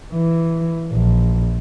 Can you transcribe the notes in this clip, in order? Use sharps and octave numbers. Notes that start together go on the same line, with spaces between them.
E3
A#1